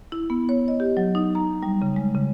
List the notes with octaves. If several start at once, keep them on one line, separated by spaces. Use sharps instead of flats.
E4
B3
C#5
D#5
G4
F#3
D#4
A#5
G3
C#3
G#3
C#3